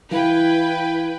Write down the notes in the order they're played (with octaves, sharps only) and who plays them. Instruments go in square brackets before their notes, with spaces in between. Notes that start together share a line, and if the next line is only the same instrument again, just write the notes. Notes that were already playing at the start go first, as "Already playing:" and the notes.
[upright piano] E3 [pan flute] E4 [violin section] B4 G5 [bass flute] F5